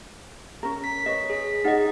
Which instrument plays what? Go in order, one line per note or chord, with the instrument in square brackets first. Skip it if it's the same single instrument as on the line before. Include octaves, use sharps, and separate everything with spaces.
[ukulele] C#4 A#4
[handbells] B6
[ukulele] B4 C#5 [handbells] D#5
[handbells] G#4 B6
[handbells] D#4 D#5 [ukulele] G#4 F#5